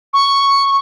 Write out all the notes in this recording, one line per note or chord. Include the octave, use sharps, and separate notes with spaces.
C#6